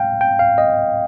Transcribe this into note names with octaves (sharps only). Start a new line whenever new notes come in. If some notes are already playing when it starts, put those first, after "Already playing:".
Already playing: F5 G5
G5
F5
D#5